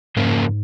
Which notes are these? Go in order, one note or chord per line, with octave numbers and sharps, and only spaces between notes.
F2 G#2 C#3 A#3 C#4 A#4